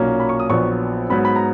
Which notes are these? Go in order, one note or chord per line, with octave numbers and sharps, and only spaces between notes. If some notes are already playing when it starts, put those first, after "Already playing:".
Already playing: B1 A#2 F#3 A#3 C#4
B5
C#6
D#6
A#1 A#2 F#3 B3 C#6
G#2 F#3 B3 B5
B5
A#5